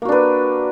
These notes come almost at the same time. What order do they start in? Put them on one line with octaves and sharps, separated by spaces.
A#3 F#4 D4 B4